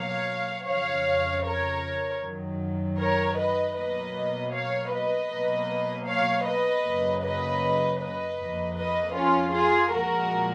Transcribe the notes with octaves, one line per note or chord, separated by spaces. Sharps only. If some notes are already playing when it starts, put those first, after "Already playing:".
Already playing: B2 F#3 A#3 C#5 F5
F2 C#3 F3 C#5 F5
A#4 C#5
F#2 D#3 F#3
A#4 C#5
B4 D#5
B2 F#3 A#3 B4 D#5
C#5 F5
B4 D#5
B2 F#3 A#3
C#5 F5
B4 D#5
F#2 C#3 F#3 A#3
B4 D#5
B4 D#5
F2 F3 A#3
B4 D#5
C#4 F4
F4 G#4
A#2 F3 G#3 F#4 A#4